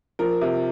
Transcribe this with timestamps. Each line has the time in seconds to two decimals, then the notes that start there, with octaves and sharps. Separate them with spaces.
0.19 F3 A#4
0.41 C3